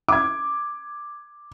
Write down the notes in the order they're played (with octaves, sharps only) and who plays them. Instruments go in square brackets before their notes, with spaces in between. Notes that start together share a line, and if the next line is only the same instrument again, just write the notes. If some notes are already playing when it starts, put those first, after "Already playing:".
[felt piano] D6 G#6